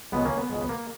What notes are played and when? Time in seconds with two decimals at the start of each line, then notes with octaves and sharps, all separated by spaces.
0.12 C#2 B2 G#3 B3
0.25 A#3 C#4
0.38 B3
0.50 C#2 B2 G#3
0.61 B3
0.69 A#3